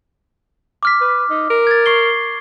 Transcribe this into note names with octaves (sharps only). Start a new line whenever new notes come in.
D6 F6 B6
B4
D#4
A#4
G#6 A6
C#6 C7 G7